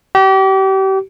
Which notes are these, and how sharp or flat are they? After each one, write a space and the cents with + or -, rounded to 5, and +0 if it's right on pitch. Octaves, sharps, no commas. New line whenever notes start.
G4 -35